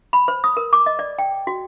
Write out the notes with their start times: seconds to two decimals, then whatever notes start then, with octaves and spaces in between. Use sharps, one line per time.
0.13 B5
0.28 C5
0.44 D#6
0.57 A#4
0.73 D6
0.86 D#5
0.99 D5
1.19 G5
1.47 F#4